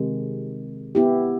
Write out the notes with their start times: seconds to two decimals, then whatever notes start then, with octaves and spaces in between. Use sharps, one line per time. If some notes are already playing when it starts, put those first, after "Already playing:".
Already playing: C3 D#3 G#3
0.95 B3 E4 G4